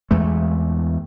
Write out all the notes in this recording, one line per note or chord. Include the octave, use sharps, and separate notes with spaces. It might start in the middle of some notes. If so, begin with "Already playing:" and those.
E2 G#3 A3